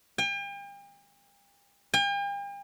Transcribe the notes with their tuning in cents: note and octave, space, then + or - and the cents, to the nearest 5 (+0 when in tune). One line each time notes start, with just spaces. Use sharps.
G5 +40
G5 +45